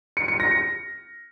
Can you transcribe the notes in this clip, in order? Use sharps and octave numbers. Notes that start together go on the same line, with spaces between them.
C#7
C#7
A#6
C#7